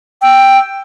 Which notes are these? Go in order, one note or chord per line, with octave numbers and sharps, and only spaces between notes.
G5 E6